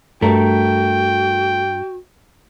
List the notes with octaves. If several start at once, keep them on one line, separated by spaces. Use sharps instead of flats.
G2 A3 F#4 A#4 G5